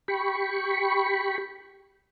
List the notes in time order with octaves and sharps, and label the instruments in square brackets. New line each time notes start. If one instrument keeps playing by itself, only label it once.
[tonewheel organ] G4 B5 C#6